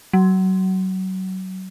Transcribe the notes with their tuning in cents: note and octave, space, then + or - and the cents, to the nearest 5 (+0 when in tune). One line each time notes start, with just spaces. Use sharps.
F#3 +25